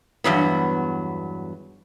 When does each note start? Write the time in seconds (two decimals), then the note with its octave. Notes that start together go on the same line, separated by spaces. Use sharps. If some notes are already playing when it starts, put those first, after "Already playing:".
0.24 E2 G2 F#3 B3